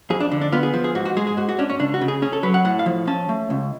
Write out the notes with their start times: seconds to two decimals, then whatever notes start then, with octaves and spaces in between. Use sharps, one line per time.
0.10 F2 G#4
0.20 D4
0.31 D3
0.41 D4
0.52 B3 F4
0.63 G#4
0.74 F3
0.84 G#4
0.95 G#2 F#4
1.05 F#4
1.17 G#3 G#4
1.27 G#4
1.37 G#2 F#4
1.49 F#4
1.59 C#4 D4
1.70 C#4
1.79 C#2 D4
1.94 F#4
2.01 C#3
2.08 G#4
2.22 C#4 G#4
2.33 A4
2.43 F#3 B4
2.54 F#5
2.65 A2 F#5
2.79 F5
2.86 F3
3.07 C#4 A5
3.29 A3
3.50 C#2